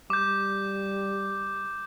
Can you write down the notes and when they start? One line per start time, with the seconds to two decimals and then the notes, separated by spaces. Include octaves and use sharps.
0.10 G3 D6 G6